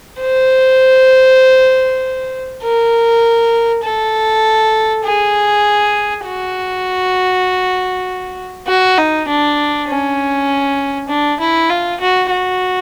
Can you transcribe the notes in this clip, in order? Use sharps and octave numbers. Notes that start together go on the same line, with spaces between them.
C5
A#4
A4
G#4
F#4
F#4
D#4
D4
C#4
D4
E4
F4
F#4
F#4